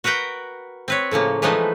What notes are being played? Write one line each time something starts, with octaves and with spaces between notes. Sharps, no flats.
F#4 A#4 B4 F#5 G5
C4 B4 C#5
A2 C#3 F3 A#3
E3 F3 G#3 A3 B3 D#4